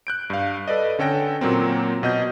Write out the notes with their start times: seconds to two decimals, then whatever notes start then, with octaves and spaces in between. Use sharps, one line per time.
0.07 F#6 G6 D7
0.30 G2 F5
0.68 A4 B4 D5 D#5
0.99 D3 C#4 A4 G5 A#6
1.41 A#2 F#3 A#3 C4
2.03 B2 D#5 G6